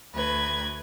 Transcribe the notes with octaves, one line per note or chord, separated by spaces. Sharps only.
D2 B4 G#6